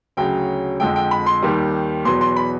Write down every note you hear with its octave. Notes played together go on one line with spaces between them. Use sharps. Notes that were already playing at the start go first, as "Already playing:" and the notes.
D2 C#3 F#3 G5
F2 D3 F3 G#3 G5
G5
B5
C6
D#2 D#3 G3
E2 B2 F#3 C6
C6
B5